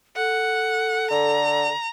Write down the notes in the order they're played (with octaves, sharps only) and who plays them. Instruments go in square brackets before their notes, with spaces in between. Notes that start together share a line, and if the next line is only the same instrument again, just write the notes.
[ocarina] A4 [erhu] F#5
[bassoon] D3 [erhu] A#5